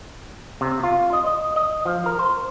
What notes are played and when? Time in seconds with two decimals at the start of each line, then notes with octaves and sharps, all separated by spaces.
0.61 C3
0.83 F4
1.13 D#5
1.26 D#5
1.56 D#5
1.86 F3
2.06 A#4
2.19 C5